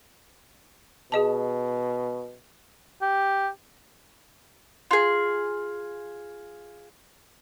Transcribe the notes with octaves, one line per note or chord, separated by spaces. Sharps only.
B2 G#4 D#5 A5
G4
F4 G#4